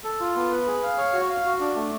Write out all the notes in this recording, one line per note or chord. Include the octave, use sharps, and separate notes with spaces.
A4
F4
B3
B4
G#4
F5
C#5
F#4
F5
F#4
D4
A3